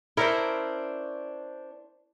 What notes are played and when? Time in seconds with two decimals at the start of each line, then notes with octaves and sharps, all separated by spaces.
0.17 C#4 D4 E4 A#4 C5